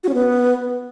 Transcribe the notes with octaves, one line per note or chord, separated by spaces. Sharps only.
F#4
C#4
B3